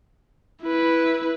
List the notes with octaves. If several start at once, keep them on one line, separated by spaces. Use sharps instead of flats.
E4 B4